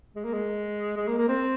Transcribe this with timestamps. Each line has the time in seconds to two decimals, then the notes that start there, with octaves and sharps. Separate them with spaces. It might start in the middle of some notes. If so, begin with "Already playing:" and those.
0.16 G#3
0.24 A#3
0.33 G#3
0.97 G#3
1.08 A#3
1.18 A#3
1.28 C4